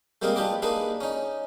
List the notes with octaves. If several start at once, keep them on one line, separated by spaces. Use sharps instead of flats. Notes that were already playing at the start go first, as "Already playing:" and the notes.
G3 G#3 A#3 C4 G#4 A#4
D4 F4 G4 B4 D#5 D6
A#3 D4 D#4 G#4 B4
C#4 D#4